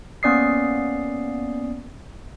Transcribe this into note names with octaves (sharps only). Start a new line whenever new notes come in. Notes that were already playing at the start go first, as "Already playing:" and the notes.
A#3 B3 C#4 D5 D#6 C7